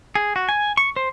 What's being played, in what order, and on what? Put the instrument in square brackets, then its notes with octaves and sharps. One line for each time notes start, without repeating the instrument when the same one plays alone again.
[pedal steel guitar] G#4
F#4
G#5
C#6
C5